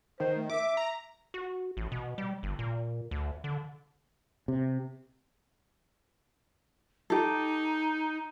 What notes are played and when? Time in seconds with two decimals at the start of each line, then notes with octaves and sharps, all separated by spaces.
0.20 D#3 C5
0.36 A3
0.50 E5 D6
0.77 A#5
1.34 F#4
1.77 A1
1.92 B2
2.18 G3
2.43 G1
2.59 A#2
3.11 D2
3.44 D3
4.48 C3
7.10 D#4 G4 A4